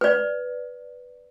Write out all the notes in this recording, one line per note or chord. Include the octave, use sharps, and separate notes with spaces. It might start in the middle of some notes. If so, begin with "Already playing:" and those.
B4 D5